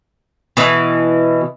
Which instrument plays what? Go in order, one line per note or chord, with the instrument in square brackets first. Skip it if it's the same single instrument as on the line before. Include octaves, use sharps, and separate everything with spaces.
[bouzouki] B2 E3